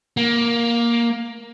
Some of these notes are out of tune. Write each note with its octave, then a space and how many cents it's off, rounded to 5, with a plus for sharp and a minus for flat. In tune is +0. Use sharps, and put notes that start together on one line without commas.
A#3 +10